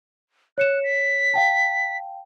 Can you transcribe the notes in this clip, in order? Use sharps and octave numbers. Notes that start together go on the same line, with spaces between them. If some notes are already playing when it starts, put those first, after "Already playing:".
C#5 F#6 C#7 E7
B6
F5 G5 A5